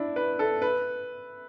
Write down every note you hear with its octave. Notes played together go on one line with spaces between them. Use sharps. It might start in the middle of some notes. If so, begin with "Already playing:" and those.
Already playing: D4 E4
B4
A4
B4